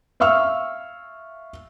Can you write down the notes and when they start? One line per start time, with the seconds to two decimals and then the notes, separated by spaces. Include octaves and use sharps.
0.20 E5 F5 C#6 E6 F6